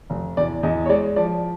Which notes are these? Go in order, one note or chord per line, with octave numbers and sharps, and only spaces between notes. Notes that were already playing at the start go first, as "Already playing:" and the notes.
F1
E2 D5
E2 D#5
C#5
G#3 D5
F3 D5